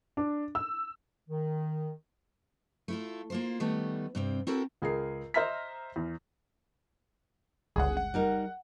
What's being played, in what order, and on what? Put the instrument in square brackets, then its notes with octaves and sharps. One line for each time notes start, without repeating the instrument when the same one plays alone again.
[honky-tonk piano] D4
E6
[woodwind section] D#3
[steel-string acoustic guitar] A3 E4 F4
A#3 F4 C5
D#3 G3 A3 B3
G2 C3 C4
C4 E4 F#4 A4 A#4
[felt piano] C#2 G#4 A#4 C7
C5 D#5 E5 A#5 F6 B6
E2
[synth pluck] G1 C#2 D3 [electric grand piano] G#4 F#5
[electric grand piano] F#5
[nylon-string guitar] G3 D#4 A#4